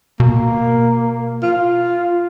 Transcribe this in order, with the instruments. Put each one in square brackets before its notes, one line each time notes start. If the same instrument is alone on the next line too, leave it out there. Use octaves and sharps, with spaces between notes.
[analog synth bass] B2 [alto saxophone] A#3
[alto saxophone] F4